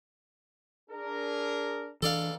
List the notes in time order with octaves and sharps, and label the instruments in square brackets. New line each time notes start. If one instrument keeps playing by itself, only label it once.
[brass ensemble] D4 G#4 A#4
[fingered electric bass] E3 D4 [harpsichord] A4 D5 F5